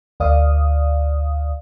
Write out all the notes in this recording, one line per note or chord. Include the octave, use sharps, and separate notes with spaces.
D2 D5 F5 D#6